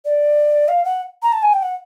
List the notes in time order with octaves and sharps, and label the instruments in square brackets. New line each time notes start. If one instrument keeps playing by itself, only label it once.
[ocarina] D5
F5
F#5
A#5
A5
G#5
G5
F#5